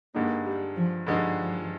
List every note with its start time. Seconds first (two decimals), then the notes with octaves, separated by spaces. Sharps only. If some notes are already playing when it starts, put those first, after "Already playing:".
0.15 G2 D3 G#3 A#3 D#4
0.45 G3
0.76 F3
1.06 G2 D3 F3 G#3 D#4